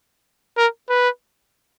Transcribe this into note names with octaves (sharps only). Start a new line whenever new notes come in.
A#4
B4